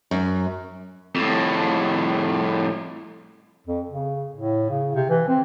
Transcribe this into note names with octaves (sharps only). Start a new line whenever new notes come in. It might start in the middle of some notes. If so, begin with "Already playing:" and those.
F#2
F2 A2
F2
C#3
A2
C#3
C3
E3
C4